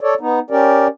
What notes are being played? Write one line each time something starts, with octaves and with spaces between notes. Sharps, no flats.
A4 C#5 D5
B3 D#4
C#4 G4 A#4 D5